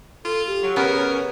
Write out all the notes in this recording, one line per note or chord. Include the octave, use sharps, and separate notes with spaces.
F4 A4
G4
F#3
C#3 B3 C#4 A#4